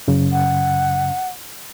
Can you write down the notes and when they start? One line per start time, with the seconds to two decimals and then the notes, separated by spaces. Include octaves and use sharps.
0.08 F#2 C#3
0.32 F#5